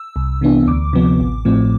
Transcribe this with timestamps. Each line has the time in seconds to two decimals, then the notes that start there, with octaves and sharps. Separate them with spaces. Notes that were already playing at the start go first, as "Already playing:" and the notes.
Already playing: E6
0.16 C2
0.41 C3 E3 B3 D4
0.67 D2 D6
0.93 C3 F3 B3
1.20 A1
1.45 A2 F3 C4